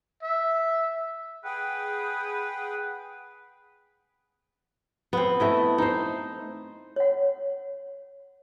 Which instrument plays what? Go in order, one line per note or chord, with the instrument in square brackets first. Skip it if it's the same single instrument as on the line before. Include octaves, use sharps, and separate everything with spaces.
[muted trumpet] E5
[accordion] G#4 F#5 G5 [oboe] B4
[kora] B3 C4
A3 E4 D#5
D#4 C5
[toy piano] C#5 F#5